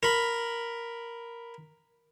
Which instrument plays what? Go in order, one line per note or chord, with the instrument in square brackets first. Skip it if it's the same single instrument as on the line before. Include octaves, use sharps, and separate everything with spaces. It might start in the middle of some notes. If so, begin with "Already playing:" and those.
[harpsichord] A#4 B5